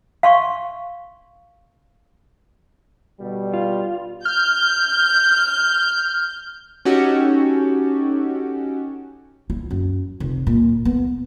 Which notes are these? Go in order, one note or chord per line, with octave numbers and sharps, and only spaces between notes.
F5 C6 C#6
B2 D3 G3
F4
F6 G6
C#4 D#4 F#4 G4 A4
E4
F#2
F1
A#2
B3